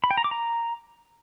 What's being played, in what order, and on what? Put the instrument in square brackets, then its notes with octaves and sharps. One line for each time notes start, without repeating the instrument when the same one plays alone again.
[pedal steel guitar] B5
G5
A#5
D6
A#5